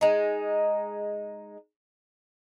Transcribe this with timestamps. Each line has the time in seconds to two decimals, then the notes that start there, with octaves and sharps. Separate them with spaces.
0.01 G#3 D#4